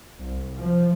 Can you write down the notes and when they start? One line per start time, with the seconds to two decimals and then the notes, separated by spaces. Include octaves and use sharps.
0.20 C2
0.57 F3